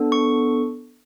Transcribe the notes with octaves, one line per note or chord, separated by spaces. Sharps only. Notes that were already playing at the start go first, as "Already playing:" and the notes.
Already playing: B3 D4 A4
C#6